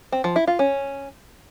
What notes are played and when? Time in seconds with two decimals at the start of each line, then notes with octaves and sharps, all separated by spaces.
0.12 C4
0.24 F3
0.36 E4
0.47 F4
0.59 C#4